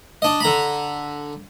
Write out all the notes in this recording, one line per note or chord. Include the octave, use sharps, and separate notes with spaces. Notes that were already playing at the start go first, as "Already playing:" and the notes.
D4 D#5
D3 A#5 B5